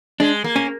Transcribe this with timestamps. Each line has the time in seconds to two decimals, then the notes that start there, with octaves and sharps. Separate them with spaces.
0.20 G#3 D4
0.44 A#3
0.56 C#4